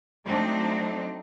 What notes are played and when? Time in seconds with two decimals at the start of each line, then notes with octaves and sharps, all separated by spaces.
0.24 F#3 A3 C4 D4 D#4